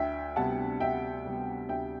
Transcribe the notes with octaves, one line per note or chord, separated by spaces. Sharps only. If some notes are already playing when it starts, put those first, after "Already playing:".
Already playing: D2 E5 G5
C3 G3 B3 F#5 A5
D2 E5 G5
C3 G3 B3
D2 E5 G5